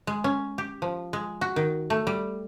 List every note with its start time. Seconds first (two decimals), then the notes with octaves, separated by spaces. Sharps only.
0.07 G#3
0.24 C#4
0.58 G4
0.82 F3
1.13 G#3
1.41 F#4
1.56 D#3
1.90 A3
2.07 G3